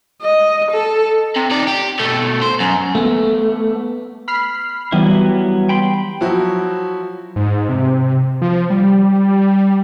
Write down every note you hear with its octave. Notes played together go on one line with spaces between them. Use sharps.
D#5
A4
C3
D#4 D5
G4
B2 A3
C5
F#2
A3 B3
B5 F6 C7
E3 F#3 G3 B3 E4
G5 B5 C6
F3 F#3 E4 F#4
G#2
C3
F3
G3